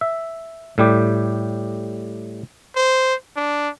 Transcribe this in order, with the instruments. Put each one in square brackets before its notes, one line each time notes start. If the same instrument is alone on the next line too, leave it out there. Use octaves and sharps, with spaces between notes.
[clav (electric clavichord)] E5
A2 G3 G4
[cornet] C5
D4